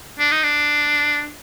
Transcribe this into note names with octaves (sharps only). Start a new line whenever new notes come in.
D4
D#4
D4